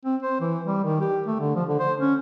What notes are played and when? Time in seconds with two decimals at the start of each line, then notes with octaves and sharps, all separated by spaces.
0.05 C4
0.22 C5
0.40 E3
0.64 G3
0.84 D#3
1.01 G4
1.26 A3
1.40 D3
1.55 F3
1.68 D3
1.80 C5
2.00 C#4